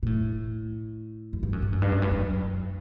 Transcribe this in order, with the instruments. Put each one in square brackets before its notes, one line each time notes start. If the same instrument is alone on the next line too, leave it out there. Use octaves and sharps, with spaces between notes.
[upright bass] A#2
A2
F#2
G2
F#2
G2
F#2
G2
F#2
G2
F#2